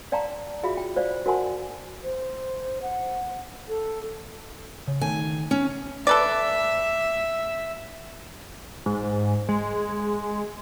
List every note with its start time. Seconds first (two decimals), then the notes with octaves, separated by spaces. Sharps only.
0.12 D5 F5 G5 A5 A#5 C6
0.63 F4 F#4 G#4 E5 F5 B5
0.77 G5
0.96 C5 D5 F5
1.26 F#4 A#4 F#5 G#5 A5 C6
2.04 C5
2.82 F#5
3.69 A4
4.88 C#3
5.01 D#3 A3 G#5
5.51 C#4 C#5
6.07 A4 B4 D5 E5
8.86 G#2
9.49 G#3